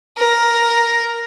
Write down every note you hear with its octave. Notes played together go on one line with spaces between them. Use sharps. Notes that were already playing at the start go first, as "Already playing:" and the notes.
A#4